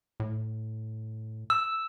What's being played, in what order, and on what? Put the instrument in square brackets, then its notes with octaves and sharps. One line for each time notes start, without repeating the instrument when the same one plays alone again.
[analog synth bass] A2
[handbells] E6